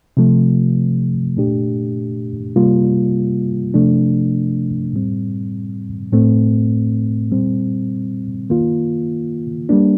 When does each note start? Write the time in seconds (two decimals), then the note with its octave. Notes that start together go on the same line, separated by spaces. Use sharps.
0.17 C3 F3 A3
1.37 A#2 A3 D4 G4
2.56 C3 G3 A#3 F4
3.74 C3 F3 A3 D4
4.93 A2 G3 C4
6.12 A2 A3 C4
7.32 A#2 G3 C4
8.50 D#3 A#3 F4
9.69 G3 A#3 D4